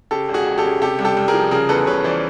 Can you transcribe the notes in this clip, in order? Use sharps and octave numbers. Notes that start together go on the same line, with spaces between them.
C#3 G4 A4
E1
F#4 G#4
E1
G4 A4
C#3
C3 G4 A4
C2
G4 A4
C2
G#4 A#4
F3
C#3 G#4 A#4
E2 A4 B4
C#3 B4 C#5
E3 C5 D5